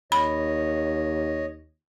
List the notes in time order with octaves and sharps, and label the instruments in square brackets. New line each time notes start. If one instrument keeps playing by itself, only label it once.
[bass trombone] D#2 [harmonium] C#5 D#5 [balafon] B5